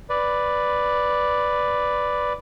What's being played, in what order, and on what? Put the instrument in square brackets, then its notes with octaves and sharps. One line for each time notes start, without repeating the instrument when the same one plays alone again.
[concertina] B4 D5